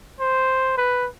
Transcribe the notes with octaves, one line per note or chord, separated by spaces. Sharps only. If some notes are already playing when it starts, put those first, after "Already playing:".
C5
B4